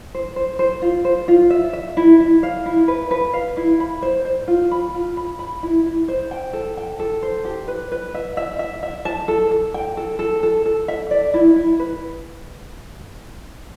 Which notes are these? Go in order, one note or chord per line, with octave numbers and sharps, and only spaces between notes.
C5
C5
C5
F4
C5
F4
E5
E5
E4
E4
F5
E4
B4
B4
F5
E4
B5
C5
C5
F4
B5
F4
B5
B5
E4
E4
C5
G5
A4
G5
A4
C5
G4
B4
B4
E5
E5
E5
E5
A5
A4
A4
G5
A4
A4
A4
A4
E5
D5
E4
E4
B4